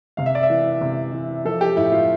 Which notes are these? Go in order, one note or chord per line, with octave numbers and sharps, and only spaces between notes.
C3 F5
E5
D5
E5
E3
C3
E3
F3 A4
G4
A2 E4
F4